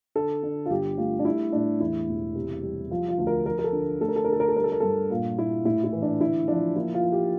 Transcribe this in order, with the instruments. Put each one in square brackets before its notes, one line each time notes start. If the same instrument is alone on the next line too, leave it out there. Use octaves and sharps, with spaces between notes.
[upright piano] D3 A4
D3
F4
G1 G4
A3 F4
D4
G3 E4
A2 D4
E2 E4
E1
C3
G3
F3 F4
F4
D2
A#4
F3 A#4
A#4
A4
D3
A3 A4
A#4
A4
A#4
D3 A4
A#4
A4
G3 A#4
A4
A#4
G2 A4
A#2 F4
A#2 E4
A2 E4
E4
E3
D4
D3 E4
F3 D4
A#3 E4
F4
F3
G4